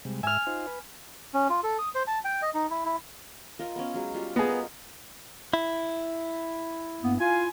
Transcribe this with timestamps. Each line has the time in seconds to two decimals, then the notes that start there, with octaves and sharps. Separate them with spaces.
0.05 C3 G3 G#3
0.23 G#2 E5 G#5 E6 F6
0.47 D#4 F4 C5
0.66 B4
1.34 C#4
1.50 F4
1.63 A4
1.79 D#6
1.95 C5
2.07 A5
2.25 G5
2.42 D#5
2.54 D#4
2.71 E4
2.85 E4
3.59 F4 A#4 D#5
3.76 B3 C#4
3.94 F#3 G#3
4.14 G3 F4 F5
4.36 B3 G#4 D#5
4.48 A#4 A#5
5.54 E4
7.02 G2 A#3 B3
7.19 F4 F5 G#5